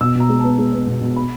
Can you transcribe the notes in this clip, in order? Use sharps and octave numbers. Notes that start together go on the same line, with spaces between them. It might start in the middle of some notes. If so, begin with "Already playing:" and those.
B2 E6
B2 A#5
G#3
B3 A5
G#3
B3
B2
B2
B5